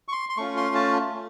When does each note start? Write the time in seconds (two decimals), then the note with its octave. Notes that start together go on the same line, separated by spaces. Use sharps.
0.08 C#6
0.12 C6
0.29 C6
0.37 A3 C#4 F4 C#6
0.57 C6
0.75 A5
1.14 A3